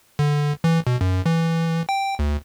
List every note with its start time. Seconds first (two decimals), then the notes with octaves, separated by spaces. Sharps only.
0.19 D3
0.64 E3
0.87 B2
1.01 F#2
1.26 E3
1.89 G5
2.19 D2